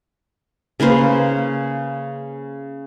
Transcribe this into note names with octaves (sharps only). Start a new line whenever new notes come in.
C#3 A#3 B4 C5